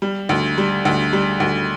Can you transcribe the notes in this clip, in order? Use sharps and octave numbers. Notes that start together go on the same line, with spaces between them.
G3
D2
G3
D2
G3
D2